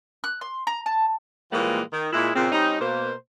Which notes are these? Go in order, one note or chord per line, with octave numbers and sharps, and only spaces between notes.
F#6
C6
A#5
A5
A#2 E3 F3 G3 G#3 A#3
D#3
A#2 G#3 E4
A#2 C#3 C4
G3 C4 C#4 D#4
B2 A#3 C5